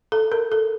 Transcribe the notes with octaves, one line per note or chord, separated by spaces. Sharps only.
A4
A#4
A4